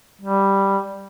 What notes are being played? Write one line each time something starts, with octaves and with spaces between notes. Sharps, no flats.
G3